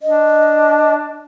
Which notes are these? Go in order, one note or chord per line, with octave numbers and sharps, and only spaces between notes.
D4 D#5